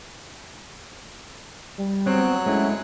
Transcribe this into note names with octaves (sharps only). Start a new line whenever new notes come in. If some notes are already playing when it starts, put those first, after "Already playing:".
G3
F#3 B3 C4 C#5 F#6
G#3 A3 C#4 E4